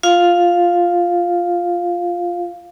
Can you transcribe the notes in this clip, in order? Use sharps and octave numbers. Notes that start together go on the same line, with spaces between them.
F4 F5